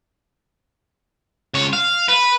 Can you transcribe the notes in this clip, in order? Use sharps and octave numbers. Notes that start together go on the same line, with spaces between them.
C#2 C#5
F5
B4